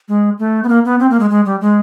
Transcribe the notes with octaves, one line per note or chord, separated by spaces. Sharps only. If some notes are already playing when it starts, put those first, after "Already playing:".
G#3
A3
B3
A#3
B3
C4
A#3
G#3
G#3
G3
G#3